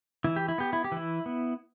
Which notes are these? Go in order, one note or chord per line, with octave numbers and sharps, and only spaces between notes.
E3 E4
G4
E4
B3 G4
E4
G4
E3
E4
B3